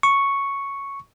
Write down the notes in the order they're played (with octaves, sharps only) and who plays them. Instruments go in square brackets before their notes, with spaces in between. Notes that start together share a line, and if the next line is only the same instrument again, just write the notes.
[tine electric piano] C#6